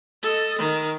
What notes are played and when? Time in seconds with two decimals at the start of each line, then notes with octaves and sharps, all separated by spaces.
0.23 A4 D#5
0.59 D#3